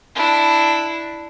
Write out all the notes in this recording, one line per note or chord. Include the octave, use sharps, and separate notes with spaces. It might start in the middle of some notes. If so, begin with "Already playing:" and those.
D4 E4